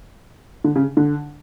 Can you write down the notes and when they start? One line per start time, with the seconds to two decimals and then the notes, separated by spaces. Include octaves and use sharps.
0.64 D3
0.76 C#3
0.97 D3